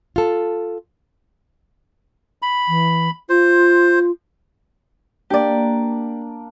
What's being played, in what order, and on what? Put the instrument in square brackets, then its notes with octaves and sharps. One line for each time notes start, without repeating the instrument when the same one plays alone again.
[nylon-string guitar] F4 A4
[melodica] B5
[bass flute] E3
[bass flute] F4 [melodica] C5
[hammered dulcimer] A#3 D4 [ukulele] G4 D5